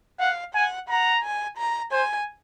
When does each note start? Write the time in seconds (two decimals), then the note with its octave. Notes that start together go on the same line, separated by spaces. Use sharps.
0.20 F5 F#5
0.55 F#5 G#5
0.89 F#5 A#5
1.23 G#5
1.58 A#5
1.92 C5 G#5